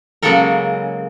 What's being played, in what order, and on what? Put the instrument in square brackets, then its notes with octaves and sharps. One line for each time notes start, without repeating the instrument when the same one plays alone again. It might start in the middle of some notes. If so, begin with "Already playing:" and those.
[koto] C#3 F#3 G#3 A#3 A4 A#4